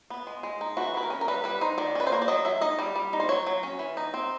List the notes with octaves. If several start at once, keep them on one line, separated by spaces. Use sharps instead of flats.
B3
G#3
G#3
D#4
E3 F#4
E3 B4
A#4
C#4
A#4
G3 B4
G3 B4
D#4 C5
D#3 D5
C#4 B4
C5
A#3 C#5
D5
F#3 D#5
F#3 E5
D#4 D#5
G3 D5
G3
D#4
C5
F#3 C#5
F#3
C#4
E3
D#4
C4